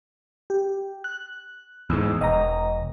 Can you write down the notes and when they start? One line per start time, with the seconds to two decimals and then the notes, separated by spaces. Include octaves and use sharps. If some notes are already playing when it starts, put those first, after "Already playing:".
0.50 G4
1.04 F#6
1.90 E2 G#2
2.21 E1 D#5 A#5